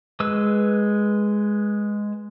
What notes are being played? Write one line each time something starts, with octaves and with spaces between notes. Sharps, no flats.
G#3 B4 E6